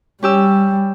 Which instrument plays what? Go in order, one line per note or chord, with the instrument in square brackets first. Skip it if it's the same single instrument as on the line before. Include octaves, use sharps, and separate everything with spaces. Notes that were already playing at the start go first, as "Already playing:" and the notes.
[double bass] G3 [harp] C#4 G4 E6